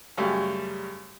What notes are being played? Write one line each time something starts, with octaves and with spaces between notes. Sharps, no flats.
F#2 C#3 G3 A3